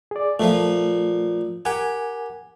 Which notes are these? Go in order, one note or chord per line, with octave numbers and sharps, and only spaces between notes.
G#4 D5
A#2 F3 A3
G4 A#4 F#5 G#5